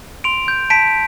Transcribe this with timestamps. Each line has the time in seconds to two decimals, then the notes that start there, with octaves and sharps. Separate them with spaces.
0.24 C6 D7 F7
0.48 G6
0.70 A5 B6 D7